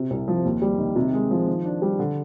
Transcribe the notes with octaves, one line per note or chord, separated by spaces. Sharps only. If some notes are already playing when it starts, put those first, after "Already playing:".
Already playing: C3
C2
F3
D#2
G3
D#3
C3
G#3
F3
D#3
D4
G3
D3